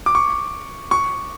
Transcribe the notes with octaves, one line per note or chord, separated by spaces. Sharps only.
D6
C#6
C#6